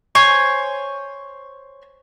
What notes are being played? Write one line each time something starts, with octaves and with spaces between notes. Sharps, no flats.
C5 C#5 G#5 C#6